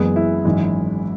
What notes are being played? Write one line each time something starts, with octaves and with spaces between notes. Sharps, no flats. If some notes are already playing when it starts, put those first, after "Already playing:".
Already playing: F#1 F#2 E3 G#3 B3 G#4
E4
G#1 F#2 E3 G#3